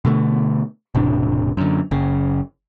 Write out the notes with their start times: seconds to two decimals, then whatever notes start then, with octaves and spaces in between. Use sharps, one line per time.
0.05 B2 D3 A3
0.95 E1 A2 C3 D4
1.57 F#2 D3
1.91 F#1 C#3